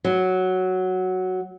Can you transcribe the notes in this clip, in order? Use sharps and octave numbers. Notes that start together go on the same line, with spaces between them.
F#3